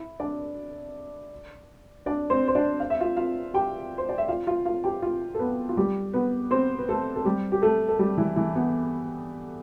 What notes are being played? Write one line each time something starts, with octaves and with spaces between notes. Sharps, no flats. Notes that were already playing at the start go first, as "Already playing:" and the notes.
Already playing: E4
D4 D5
D4 D5
C4 C5
C5
D4 D5
F5
E5
F4 F5
F4 F5
G4 G5
C5
D5
E5
F4 F5
F4 F5
F4 F5
G4 G5
F4 F5
A4
B3 B4
F4
G3 G4
B3 B4
C4 C5
B4
A3 A4
A4
G3 G4
G4
A3 A4
A4
G3 G4
E3 E4
E3 E4
B3